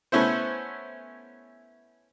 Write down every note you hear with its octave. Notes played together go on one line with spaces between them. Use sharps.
A3 B3 C#4 E4 C5